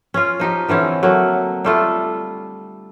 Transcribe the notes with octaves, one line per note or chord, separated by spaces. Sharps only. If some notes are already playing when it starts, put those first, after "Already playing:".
C#4 F4
F3 D#4 G4
D3 E3 C4 C#4
F#3 A3 A#3
G3 A3 F4